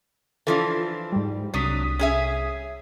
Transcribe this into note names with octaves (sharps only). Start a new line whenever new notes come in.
E3 F3 D4 F4 A4
G#2 G3
C2 F#3 D4 D#6 B6
C#4 G#4 E5